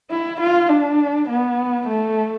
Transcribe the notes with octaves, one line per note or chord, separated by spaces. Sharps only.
E4
F4
D4
B3
A3